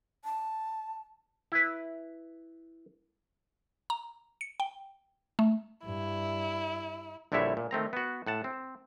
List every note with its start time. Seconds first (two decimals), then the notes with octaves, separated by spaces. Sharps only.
0.25 A5
1.52 E4 B4
3.90 A#5
4.41 C#7
4.60 G5
5.39 A3
5.85 G2 E4
7.32 A#1 D3 G3 E4 C#5 E5
7.57 A#2
7.71 D#3 A3 C4 A#5
7.93 B3 F#4
8.27 A2 F#5 A5
8.44 C4